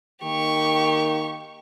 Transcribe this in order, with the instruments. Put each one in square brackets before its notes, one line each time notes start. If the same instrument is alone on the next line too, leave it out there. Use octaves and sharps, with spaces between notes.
[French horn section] D#3 A#3 [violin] G4 C#6